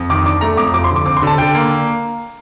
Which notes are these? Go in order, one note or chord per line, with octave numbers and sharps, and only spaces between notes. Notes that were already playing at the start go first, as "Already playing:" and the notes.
Already playing: F2
D#3 D6
D4 D6
A3 A#5
F2 D6
F3 D6
C6
D3
D6
C4 D6
C6
D3 A5
D3 G5
A#3